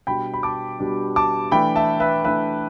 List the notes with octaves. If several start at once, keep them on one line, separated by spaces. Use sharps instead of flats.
B2 G3 D4 G5 B5
B5
A5 D6
B2 G3 D4
A5 D6
E3 A3 D4 G5 B5
E5 A5
B4 E5
E3 A3 D4 B4 E5